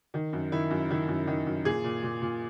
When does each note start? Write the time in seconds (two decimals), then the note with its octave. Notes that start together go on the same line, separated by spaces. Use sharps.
0.14 D#3
0.33 F#2
0.52 D#3 E4
0.70 F#2
0.90 D#3 E4
1.08 F#2
1.27 D#3
1.47 F#2
1.65 A#2 G#4
1.84 A#2
2.03 A#2
2.22 A#2